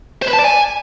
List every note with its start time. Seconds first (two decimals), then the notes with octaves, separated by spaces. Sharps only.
0.22 C5
0.28 B4
0.33 A5
0.39 D5
0.44 G#5